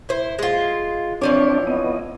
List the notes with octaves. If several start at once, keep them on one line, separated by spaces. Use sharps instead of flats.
E4 C5
G#3 F4
E3 F3 C4 D4 C#5 D5
B3 D#5